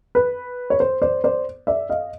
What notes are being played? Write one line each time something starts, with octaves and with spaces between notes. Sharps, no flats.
B4
C#5
C5
C5 D5
C5 D5
D5 E5
D#5 F5